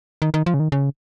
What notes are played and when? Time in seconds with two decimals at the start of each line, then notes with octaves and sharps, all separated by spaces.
0.22 D#3
0.34 D#3
0.46 F3
0.54 C#3
0.60 D#3
0.72 C#3